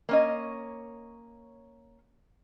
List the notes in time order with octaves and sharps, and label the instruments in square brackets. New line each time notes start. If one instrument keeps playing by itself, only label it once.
[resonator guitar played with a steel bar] A#3 C#4 D#5